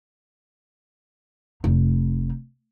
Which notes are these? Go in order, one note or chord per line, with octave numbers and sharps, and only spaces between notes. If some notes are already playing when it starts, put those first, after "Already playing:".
F1 D#4